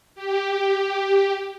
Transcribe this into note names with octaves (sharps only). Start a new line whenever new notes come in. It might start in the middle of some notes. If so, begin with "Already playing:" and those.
G4